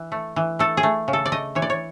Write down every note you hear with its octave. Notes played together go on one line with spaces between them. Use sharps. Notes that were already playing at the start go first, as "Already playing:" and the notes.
Already playing: E3
A3
E3
A3 A4
G#4
A3
C#3
A4
D5
A3 D#5
E3 C#5
D5
C#5